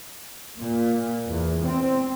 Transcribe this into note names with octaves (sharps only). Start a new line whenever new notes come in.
A#2
E2
C4